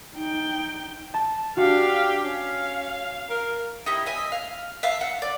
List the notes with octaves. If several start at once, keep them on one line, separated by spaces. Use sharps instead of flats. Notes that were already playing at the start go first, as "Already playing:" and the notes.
D#4 G5
A5
D4 F#4 G4 F5
C#4 F5
A#4
D#4 E4 G4
D#5 E5 G#5
F5
E5 F5 A5
F#5
D5